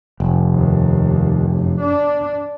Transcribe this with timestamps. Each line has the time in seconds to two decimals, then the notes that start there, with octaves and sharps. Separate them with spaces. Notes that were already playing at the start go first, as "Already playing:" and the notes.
0.20 F1
0.54 D#2
1.51 F#2
1.81 D4